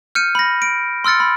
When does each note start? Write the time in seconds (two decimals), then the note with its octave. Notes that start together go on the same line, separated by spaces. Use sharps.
0.15 F6 G6 C#7 D#7
0.35 B5 A#6
0.62 D7
1.04 C6 E6 F6 A6 C#7
1.20 B5